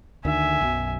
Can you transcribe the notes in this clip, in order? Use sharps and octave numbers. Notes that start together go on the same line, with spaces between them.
D2 D3 D#3 E5 G#5
B1 F#2 B2